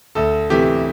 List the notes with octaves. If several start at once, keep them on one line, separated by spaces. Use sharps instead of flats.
D2 A4
C3 E3 A3 G4